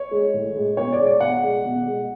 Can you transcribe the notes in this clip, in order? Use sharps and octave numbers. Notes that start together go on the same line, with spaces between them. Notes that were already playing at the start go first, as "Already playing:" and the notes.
Already playing: C#5
G#3
A2
G#3
B2 C#5
D5
G#3
D5
B2 F#5
G#3
B2
G#3